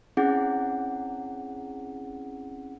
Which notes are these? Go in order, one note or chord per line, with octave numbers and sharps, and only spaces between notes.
C4 C#4 E4 G#4 F#5